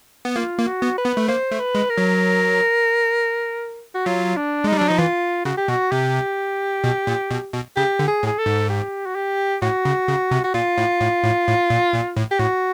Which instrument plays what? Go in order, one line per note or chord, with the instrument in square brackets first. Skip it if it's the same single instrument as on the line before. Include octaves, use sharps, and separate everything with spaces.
[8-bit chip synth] B3
[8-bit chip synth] A#3 [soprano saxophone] F4
[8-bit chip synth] A#3
[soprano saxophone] F#4
[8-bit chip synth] B3
[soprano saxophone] B4
[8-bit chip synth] B3
A3
[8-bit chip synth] A#3 [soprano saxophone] C5
[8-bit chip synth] A3
[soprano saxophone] B4
[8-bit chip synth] G#3
[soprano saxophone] A#4
[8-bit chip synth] F#3
[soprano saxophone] F#4
[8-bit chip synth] F#3 [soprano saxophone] F4
[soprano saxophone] D4
[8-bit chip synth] G#3
[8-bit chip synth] G3 [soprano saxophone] D#4
[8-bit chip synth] F#3 [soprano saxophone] D4
[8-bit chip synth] F3 [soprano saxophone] D#4
[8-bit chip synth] E3 [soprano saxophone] F4
[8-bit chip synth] C#3 [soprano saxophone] F#4
[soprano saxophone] G4
[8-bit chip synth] B2 [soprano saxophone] F#4
[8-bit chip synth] C3 [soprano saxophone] G4
[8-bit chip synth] B2
A#2
B2
B2
[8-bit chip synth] C#3 [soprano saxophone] G4
[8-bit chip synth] D3
[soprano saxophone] G#4
[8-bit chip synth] A2
[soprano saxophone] G#4
A4
[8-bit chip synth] G#2
[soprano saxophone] G4
F#4
G4
[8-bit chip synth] A2 [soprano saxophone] F#4
[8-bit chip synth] C#3
C#3
C3
[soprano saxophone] F#4
[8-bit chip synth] A#2 [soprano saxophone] F4
[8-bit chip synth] A2
A2
A2
A2
A#2
A#2
A2
[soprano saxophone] G4
[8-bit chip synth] A2 [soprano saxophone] F#4